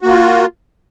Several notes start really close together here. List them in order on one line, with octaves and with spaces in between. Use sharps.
F#4 A#3 F4